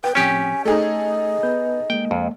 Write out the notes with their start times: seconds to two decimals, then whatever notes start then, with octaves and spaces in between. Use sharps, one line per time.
0.04 B4 G5
0.15 A2 F3 C4 C#4 G4 G#5
0.65 A3 D#4 G#4 A4 D#5
1.43 B3 B4 G6
1.90 G#3 A#3 G5
2.11 F2